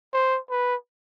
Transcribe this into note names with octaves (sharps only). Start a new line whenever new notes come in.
C5
B4